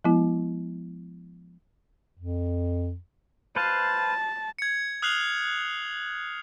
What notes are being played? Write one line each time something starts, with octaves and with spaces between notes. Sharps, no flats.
F3 G#3 B3 E4
F2
B4 C5 F5 A5
G#6 C#7
D#6 F6 F#6 C7 F7 F#7